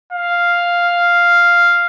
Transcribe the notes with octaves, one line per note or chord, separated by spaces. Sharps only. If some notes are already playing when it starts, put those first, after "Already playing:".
F5